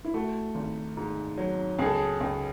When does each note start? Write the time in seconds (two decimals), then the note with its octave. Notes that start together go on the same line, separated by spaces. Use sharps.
0.05 E4
0.14 A3 F#4
0.55 G#1
0.97 G#2
1.37 F#3
1.79 C#2 G#4
1.86 A4
1.94 G#4
2.21 C#2